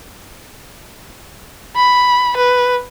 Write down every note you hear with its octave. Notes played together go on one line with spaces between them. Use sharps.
B5
B4